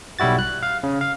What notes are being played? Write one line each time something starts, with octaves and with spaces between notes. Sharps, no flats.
B1 G3 E4 F#4 A6
F#6
F5
C#3
F5